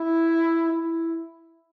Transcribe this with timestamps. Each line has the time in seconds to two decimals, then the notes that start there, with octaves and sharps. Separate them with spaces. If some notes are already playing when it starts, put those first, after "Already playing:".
Already playing: E4
0.72 E4